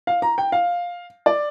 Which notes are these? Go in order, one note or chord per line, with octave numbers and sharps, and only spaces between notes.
F5
A#5
G5
F5
D5